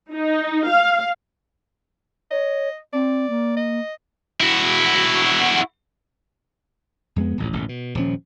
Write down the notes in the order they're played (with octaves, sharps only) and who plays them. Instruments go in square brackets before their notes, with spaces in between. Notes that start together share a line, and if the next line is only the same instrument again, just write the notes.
[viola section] D#4
F5
[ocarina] C#5 [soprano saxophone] D#5
[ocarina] C4 [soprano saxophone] D5
[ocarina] A#3
[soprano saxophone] D#5
[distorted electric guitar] E4 F#4
[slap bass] F2 G#3 B3
D1 A1 F2
D#1 A1 D#2
B2
D#1 F3 C#4